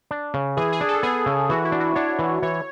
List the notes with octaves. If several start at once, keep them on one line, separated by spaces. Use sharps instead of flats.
D4
C#3
E3 G#4
G#4
D4
A4
B3 G#4
C#3
E3 F#4
E4
D4
F#4
D4 C#5
E3
E3 C#5